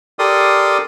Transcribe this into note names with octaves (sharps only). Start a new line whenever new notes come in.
G4 A4 A#4 D5 C6 D#6